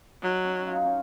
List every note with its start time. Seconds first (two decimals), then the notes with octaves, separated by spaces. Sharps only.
0.22 F#3 D#4
0.44 C#4
0.67 F4
0.75 D#4
0.85 C#4